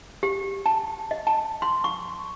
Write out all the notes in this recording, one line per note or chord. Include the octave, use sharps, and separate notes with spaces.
G4
A5
D#5
A5
C6
C#6